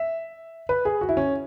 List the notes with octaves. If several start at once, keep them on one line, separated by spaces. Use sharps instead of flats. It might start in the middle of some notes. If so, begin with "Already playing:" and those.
Already playing: E5
B4
G#4
F#4
E4
C#4